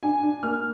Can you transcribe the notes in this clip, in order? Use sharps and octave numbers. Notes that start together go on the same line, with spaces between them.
D4 G#5
D4
A#3 F6